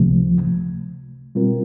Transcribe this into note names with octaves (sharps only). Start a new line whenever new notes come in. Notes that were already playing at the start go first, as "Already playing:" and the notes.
Already playing: C#2 C3 F3 A3
B2 G3 C4 F4 A#4